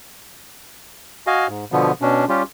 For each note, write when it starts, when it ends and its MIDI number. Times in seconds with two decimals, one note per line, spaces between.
1.27 1.47 66
1.27 1.47 75
1.27 1.47 77
1.27 1.47 80
1.48 1.65 44
1.72 1.92 47
1.72 1.92 50
1.72 1.92 53
1.72 1.92 59
2.02 2.25 47
2.02 2.25 61
2.02 2.25 62
2.29 2.43 55
2.29 2.43 61
2.29 2.43 65
2.29 2.43 67